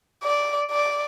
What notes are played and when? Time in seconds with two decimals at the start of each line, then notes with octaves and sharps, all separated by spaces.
0.24 D5
0.71 D5